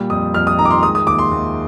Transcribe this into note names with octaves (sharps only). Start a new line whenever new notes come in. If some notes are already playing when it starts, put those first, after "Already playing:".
Already playing: A#2 G3
F2 D#6
F2 F6
D#6
D#3 A#5
D6
C6
G#3 D#6
D#6
D#2 D6
C6
D#2